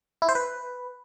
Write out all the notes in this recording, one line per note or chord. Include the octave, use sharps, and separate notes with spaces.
E4
C5
B4